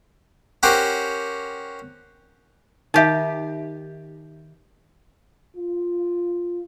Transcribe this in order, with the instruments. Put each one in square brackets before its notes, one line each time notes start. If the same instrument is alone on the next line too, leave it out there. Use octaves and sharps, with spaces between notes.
[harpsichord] C#4 F#4 G4 A#4 C5
[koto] D#3 G4 [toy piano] D#4 E5
[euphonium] F4